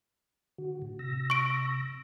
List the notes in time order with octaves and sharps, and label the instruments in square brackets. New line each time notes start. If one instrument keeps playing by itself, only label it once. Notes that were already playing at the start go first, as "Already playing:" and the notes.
[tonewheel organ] D3 F#4
A2
C3 E6 A#6
[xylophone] C#6 D7